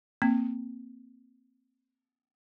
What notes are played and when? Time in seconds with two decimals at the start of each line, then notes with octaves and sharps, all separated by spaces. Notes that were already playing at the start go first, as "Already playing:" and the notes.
0.22 A#3 C4